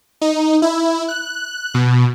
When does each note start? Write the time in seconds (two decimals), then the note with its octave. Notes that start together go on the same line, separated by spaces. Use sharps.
0.21 D#4
0.62 E4
1.08 F#6
1.74 B2